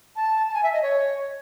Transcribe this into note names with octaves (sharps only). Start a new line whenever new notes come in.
A5
A5
G#5
E5
D#5
C#5